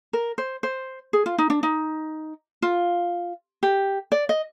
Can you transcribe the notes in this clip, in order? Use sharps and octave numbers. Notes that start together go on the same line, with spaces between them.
A#4
C5
C5
G#4
F4
D#4
D4
D#4
F4
G4
D5
D#5